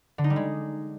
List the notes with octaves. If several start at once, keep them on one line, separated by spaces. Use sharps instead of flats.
D3
D#4
G3
G#3